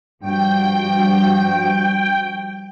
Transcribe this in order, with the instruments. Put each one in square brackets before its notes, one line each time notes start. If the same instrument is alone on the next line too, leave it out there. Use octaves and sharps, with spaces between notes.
[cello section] G2 F3 F#4 [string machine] G5